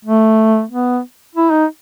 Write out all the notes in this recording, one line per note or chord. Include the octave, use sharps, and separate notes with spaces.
A3
B3
E4
D#4